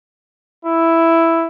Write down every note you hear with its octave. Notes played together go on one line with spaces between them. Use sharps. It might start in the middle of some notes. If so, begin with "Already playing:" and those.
E4